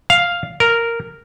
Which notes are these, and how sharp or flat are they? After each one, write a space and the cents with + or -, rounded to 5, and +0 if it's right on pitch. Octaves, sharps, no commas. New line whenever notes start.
F5 +0
A#4 -5